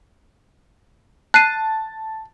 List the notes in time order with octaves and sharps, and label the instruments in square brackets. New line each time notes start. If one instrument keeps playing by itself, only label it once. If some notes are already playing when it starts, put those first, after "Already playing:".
[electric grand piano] A5 [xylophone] F#6 C7 D#7